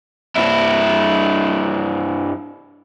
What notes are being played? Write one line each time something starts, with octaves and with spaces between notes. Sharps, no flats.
G2 E4